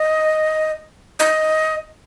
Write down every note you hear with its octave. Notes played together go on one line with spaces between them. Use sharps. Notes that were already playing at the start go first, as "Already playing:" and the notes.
Already playing: D#5
D#5